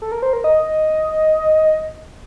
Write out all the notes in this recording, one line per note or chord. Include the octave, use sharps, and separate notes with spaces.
A4
A#4
C5
A#4
D#5